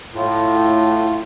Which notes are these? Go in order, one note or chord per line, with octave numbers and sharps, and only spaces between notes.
A2 F4